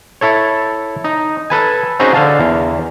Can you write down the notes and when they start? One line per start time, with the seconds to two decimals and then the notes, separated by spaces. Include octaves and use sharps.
0.21 E4 A4 C#5
1.04 D#4
1.50 A4 B4 G#5
2.00 C4 C#4 D#4 F#4 G#4 C5
2.14 D3 F5 A5
2.40 E2